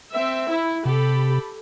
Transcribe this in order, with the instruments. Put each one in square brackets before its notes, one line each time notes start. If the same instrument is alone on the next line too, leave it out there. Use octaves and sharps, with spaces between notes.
[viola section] C4 E5
E4
[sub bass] C3 [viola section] G4 A4 B5